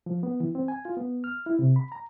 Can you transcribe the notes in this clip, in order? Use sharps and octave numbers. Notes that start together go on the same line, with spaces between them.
F3
B3
E3
C4
G#5
F4
B3
F6
E4
C3
B5
A#5